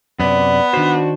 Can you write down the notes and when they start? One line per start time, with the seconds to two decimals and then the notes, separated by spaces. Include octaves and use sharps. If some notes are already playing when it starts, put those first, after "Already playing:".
0.20 F#2 C3 B3 D5
0.74 D#3 D4 F#4 C5